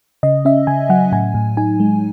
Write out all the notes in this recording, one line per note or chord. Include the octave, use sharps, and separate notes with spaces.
C#3 D#5
C#4 E5
C#3 G#5
F#3 F#5
A2 G#5
A2
D#4 G#5
G#3